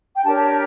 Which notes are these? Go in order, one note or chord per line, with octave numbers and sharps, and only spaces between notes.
G5
D4 G4 A#4 C#5 A5